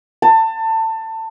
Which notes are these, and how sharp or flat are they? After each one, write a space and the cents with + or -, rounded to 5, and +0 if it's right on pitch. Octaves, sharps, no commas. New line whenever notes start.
A5 +25